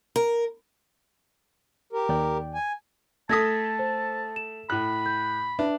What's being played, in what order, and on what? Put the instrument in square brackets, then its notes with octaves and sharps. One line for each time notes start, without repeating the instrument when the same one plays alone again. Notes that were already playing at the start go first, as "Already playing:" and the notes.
[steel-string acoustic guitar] A#4
[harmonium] G4 A#4
[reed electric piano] D#2 D5 G5
[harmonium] G#5
[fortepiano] A3 A4 D#6 [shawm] A5 [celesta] G#6 A#6 B6
[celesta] C5
E7
[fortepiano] A2 F#6 [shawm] B5
[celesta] G6
[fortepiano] D4 [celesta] B4 E5